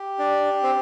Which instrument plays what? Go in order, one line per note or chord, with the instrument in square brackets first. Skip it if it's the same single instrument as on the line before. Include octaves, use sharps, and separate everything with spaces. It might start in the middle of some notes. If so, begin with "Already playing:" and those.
Already playing: [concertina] G4
D4 D5
C4 C5